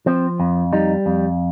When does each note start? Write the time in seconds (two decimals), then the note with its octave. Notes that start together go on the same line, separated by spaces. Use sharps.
0.06 F3 C4
0.40 F2
0.73 G3 D#4
1.06 F2